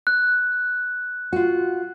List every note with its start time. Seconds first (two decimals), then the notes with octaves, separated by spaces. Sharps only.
0.07 F#6
1.33 F4 F#4